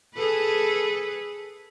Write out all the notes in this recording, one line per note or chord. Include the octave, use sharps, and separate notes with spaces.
G#4 A4 B4